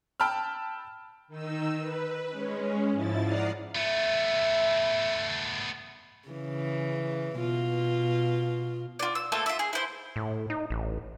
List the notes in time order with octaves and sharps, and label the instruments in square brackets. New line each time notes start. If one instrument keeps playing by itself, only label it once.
[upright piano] G5 A5 B5 E6 F6
[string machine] D#3 D#4 E6
B4
G#3 C#4
G#2 F3 E4 A6
D5 F#5 A#5 D#6 F6 C7
[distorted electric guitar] A3 B3 [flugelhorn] E5
[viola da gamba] C#3 E3
B2 F4
[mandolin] F4 D5
E6
A3 A#3 A4 C5
F4 E5
G#4
E4 C5
[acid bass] A2
D#4
A1